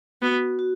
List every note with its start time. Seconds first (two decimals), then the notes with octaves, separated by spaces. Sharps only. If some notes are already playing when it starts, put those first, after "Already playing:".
0.22 B3 F#4
0.59 F#4